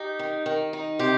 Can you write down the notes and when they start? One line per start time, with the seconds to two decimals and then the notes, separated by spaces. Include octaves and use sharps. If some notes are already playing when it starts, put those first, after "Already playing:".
Already playing: D#4 G4
0.19 D#3
0.46 D#3
0.73 D#4
0.99 C3 G4